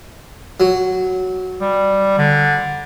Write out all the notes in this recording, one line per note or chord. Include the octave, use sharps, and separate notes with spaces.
F#3
G3
D3